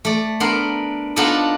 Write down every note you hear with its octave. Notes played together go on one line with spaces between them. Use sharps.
A3 D5
B3 D4 A#4 C6
B3 D4 D#4 F4 A4 D#5